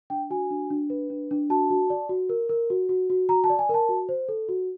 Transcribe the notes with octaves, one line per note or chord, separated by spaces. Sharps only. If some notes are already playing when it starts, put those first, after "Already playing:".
D4 G5
F#4 G#5
D4
D4
B4
D4
D4
F#4 A5
F#4
D5
F#4
A#4
A#4
F#4
F#4
F#4
F#4 A#5
A5
D5
G#5
A#4 A5
F#4
C5
A4
F#4